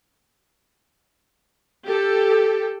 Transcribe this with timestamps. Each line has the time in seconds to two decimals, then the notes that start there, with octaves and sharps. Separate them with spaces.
1.86 G4 A4